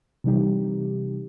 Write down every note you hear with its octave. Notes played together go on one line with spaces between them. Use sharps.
C3 E3 G3 D#4 G4